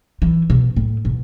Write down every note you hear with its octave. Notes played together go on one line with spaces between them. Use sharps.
E3
B2
A2
B2